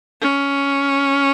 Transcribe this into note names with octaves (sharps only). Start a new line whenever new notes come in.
C#4